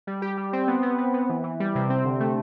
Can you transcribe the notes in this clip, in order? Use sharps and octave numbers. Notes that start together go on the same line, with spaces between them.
G3
G4
G3
C4
B3
B3
B3
B3
E3
E3
G3
C3
C4
D3
A3